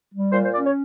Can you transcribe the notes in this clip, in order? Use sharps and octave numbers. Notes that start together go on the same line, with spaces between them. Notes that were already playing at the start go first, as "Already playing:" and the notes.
G3
A#2 C5
C5
C#4 D5
C#5